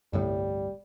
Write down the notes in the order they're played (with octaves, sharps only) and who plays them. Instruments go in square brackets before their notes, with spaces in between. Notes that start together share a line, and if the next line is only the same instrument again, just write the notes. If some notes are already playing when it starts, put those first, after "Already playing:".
[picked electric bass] G1 C2 A2 [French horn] G3